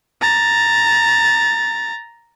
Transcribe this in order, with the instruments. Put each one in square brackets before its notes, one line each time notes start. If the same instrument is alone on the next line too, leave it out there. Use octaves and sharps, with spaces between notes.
[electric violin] A#5 A6